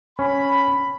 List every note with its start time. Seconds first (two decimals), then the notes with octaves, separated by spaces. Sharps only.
0.19 C#4 B5